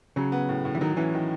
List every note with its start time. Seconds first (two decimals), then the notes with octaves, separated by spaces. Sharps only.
0.16 C#3 F#3
0.32 B3
0.49 A2
0.65 A2
0.75 E3
0.81 D#3 F#3
0.97 E3 C#4
1.14 D#3